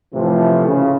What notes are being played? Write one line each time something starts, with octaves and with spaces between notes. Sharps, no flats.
A2 C3 E3 F3 A3
C#3